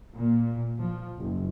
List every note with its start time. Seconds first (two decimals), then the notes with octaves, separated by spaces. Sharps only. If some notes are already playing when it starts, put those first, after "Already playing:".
0.14 A#2
0.80 F3
1.19 F#1